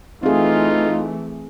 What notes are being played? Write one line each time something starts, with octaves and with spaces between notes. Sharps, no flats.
E3 A3 C4 D#4 F4 G#4